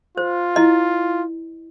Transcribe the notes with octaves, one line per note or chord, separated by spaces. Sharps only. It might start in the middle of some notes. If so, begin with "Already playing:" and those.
F4 C5
E4 D#5